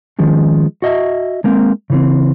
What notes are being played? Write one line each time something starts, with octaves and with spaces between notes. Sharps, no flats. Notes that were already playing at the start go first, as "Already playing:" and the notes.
D#3 F3 G#3 C#4
F#4 D#5 E5
G#3 A#3 C4
C#3 E3 C4